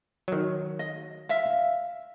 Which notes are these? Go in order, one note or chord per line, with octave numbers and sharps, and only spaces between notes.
D#3 F#3
D#5
E5 F5